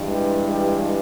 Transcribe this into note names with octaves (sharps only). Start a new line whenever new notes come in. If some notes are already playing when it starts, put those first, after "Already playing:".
Already playing: G2 E3 G#3
G4
G4